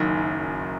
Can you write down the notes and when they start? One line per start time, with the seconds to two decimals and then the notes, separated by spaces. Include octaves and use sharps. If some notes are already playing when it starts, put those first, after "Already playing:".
Already playing: F#1 F#2 D#3